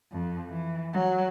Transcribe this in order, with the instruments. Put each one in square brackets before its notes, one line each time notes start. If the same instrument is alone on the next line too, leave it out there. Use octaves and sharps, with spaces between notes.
[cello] F2
E3
F#3